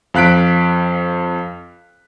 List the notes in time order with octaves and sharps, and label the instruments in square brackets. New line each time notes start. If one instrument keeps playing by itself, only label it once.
[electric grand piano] F2 F5 F#6 B6 D7